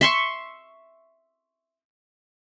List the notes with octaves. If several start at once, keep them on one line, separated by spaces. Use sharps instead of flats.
E5 C6 C#6